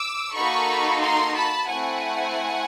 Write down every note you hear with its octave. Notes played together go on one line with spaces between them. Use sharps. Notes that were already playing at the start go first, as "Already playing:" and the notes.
Already playing: D6 E6
A#3 D#4 F#4 A4 B5 C#6
A#5 C6
A5 B5
A3 C4 E4 F#5 G#5